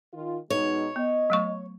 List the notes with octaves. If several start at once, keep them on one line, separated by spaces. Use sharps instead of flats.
D#3 F4
B2 G#3 D#4 C#5
B3 D#5
F#3 A3 C#6